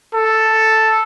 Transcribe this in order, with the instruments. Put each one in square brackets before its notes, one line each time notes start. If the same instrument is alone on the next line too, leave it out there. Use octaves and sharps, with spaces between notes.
[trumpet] A4